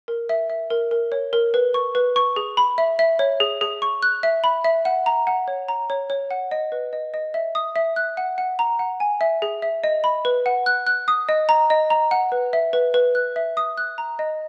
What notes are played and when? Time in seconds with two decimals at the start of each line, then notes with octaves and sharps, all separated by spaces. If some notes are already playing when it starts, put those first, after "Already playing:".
0.08 A#4
0.29 E5
0.50 E5
0.70 A#4
0.91 A#4
1.12 C#5
1.33 A#4
1.54 B4
1.74 C#6
1.95 B4
2.16 C#6
2.36 G#4
2.57 B5
2.78 E5
2.99 E5
3.19 C#5
3.40 G#4
3.61 G#4
3.82 C#6
4.03 F#6
4.23 E5
4.44 B5
4.64 E5
4.85 F#5
5.06 A#5
5.27 F#5
5.48 C#5
5.68 A#5
5.90 C#5
6.10 C#5
6.31 F#5
6.51 D#5
6.72 B4
6.93 D#5
7.14 D#5
7.34 E5
7.55 D#6
7.76 E5
7.96 F#6
8.17 F#5
8.38 F#5
8.59 A#5
8.79 F#5
9.00 G#5
9.21 E5
9.42 G#4
9.62 E5
9.84 D#5
10.04 B5
10.25 B4
10.46 F#5
10.66 F#6
10.87 F#6
11.08 D#6
11.29 D#5
11.49 A#5
11.70 D#5
11.90 A#5
12.11 F#5
12.32 B4
12.53 E5
12.73 B4
12.94 B4
13.15 F#6
13.36 E5
13.57 D#6
13.77 F#6
13.98 A#5
14.19 D#5